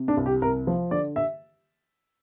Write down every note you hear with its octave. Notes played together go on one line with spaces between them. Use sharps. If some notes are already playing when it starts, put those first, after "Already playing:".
Already playing: C3
D4
C2
G4
C2 A#4
F3
D3 D5
E5